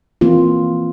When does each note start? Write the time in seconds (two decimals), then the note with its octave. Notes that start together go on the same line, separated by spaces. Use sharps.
0.21 E3 A#3 C4 F4